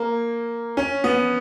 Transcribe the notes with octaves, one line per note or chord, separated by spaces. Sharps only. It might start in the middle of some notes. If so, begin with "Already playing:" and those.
Already playing: A#3
C#4
B3